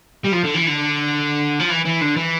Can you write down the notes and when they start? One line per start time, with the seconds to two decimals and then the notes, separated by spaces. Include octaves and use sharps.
0.24 G3
0.32 F3
0.44 D3
0.54 E3
0.67 D3
1.60 F3
1.70 E3
1.85 E3
2.01 D3
2.17 E3